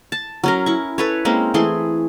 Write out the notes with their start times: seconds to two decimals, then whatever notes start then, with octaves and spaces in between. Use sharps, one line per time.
0.12 A5
0.44 F#3 C#4 A#4
0.66 E4 C#6
0.98 A4 B4 C#5
1.25 G#3 A#3 C4 C#4
1.54 E3 A3 G#4 C6